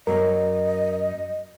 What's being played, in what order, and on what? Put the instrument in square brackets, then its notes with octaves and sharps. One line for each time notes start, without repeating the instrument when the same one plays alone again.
[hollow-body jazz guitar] F#2 F#3 A#3 [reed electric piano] A#4 [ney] D#5